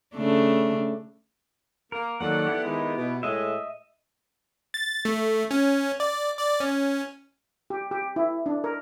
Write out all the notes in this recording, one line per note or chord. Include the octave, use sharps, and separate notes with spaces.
C#3 A3 D4
A#3 A#4
D#3 F#3 A#3 A4 D5 F#5
B3 E4 G4
D#3 G#3
B2
A2 G#3 D#5 E5
A6
A3
C#4
D5
D5
C#4
G4
G4
E4
D4
A#4